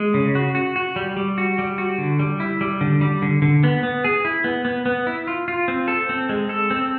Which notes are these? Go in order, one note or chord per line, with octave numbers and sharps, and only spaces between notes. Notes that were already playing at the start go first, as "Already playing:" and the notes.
Already playing: G#3
C#3
F#4
F#4
F#4
G3
G3
F#4
G3
F#4
D3
G3
E4
G3
D3
G3
D3
D3
B3
B3
G#4
E4
B3
B3
B3
E4
F4
F4
C4
A4
C4
G#3
A4
C4